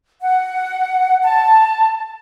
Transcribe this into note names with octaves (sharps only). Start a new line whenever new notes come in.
F#5
A5